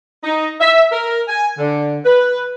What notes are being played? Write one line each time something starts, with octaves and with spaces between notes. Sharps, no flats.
D#4
E5
A#4
G#5
D3
B4